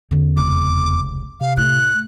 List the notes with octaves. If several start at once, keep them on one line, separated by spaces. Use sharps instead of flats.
E2 D3 C#4
F1 C#2 D6
C3 F5
A2 F#6